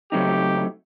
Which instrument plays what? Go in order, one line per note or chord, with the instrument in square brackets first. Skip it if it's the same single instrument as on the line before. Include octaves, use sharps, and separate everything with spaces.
[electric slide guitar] C#3 F#3 A3 C4 D#4 [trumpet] G4